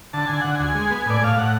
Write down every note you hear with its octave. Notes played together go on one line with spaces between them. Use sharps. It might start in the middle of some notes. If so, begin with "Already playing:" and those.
D3 A5
D3 G#5
D3 F#5
D2 G#5
G#3
B3
A2 D5
A2 F5
A2 F#5